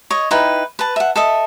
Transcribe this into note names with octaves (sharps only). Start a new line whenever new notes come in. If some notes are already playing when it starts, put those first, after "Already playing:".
C#5 D#5
D#4 E4 B4 G5
B4 A5
E5 F#5
A4 D#5 E5